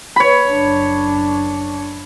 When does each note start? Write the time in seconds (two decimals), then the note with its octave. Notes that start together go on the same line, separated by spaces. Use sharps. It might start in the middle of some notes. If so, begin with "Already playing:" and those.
0.16 C#5 B5
0.50 F#1 D4